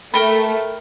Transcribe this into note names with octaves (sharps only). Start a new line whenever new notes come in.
A3 A#4 G5 B5